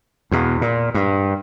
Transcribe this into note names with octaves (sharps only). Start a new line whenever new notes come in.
E2 B2
A#2
G2